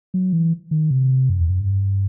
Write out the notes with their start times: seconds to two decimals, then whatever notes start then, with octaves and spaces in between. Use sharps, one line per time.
0.14 F#3
0.33 E3
0.71 D#3
0.91 C3
1.29 F#2
1.40 E2
1.49 F#2
1.59 G2